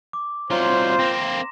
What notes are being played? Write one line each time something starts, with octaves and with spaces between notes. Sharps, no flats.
D6
C2 F#3 F4 C5 A#5 C6
A#3 C4 A#6 E7